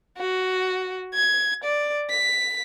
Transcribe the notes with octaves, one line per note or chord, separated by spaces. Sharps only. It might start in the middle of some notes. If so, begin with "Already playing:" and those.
F#4
G#6
D5
B6